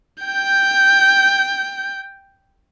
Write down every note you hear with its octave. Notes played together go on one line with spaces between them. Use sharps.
G5 G6